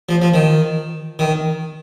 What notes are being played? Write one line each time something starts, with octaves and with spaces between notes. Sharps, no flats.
F3
F3
D#3
D#3